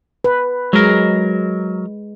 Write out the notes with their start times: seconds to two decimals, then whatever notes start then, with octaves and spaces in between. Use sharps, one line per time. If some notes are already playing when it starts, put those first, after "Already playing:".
0.24 B4
0.73 F#3 G#3 A#4